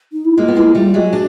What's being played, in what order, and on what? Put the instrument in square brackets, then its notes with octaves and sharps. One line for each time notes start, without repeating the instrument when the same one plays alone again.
[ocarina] D#4
E4
[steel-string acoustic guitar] G#3 A#3 [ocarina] F4
[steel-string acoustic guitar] B3
[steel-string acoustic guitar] G#3 A#3 [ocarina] E4
[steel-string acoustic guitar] G3 A3 [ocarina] F4
[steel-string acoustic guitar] F#3 G#3 [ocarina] F#4
[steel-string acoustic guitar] D4